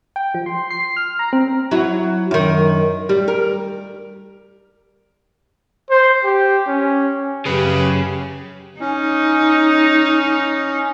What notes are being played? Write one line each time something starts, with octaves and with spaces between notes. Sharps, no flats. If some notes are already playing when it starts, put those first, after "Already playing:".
G5
F3
C6
C7
F6
A#5
C4
F#3 E4
F#2 D#3
G3
A#4
C5
G4
C#4
F#2 C#3 C#4 G4 G#4 B4
C#4 D#4